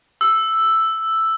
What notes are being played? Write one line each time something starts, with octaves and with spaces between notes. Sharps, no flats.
E6